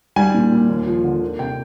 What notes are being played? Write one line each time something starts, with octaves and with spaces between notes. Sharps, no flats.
G3 G#5
A#2
A#2
D#2
F3
D3
A#3
C3 G5